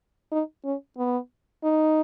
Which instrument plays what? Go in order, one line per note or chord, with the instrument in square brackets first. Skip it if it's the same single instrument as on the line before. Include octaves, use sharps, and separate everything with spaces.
[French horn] D#4
C#4
B3
D#4